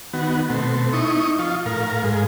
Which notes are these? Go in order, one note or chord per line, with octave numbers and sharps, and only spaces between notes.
D#3 B3 F#4
B2 A3 C4
D#4 E4 C#6 D#6
F3 F4
A2 A#4 F5
G#2 G#3